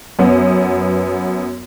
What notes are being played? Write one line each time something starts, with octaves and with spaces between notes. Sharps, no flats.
F#2 B3